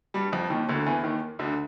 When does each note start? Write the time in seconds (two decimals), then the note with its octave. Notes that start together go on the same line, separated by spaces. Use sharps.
0.14 G2 G3
0.33 F2 F3
0.50 D#2 D#3
0.68 D2 D3
0.86 E2 E3
1.03 D#2 D#3
1.39 D2 D3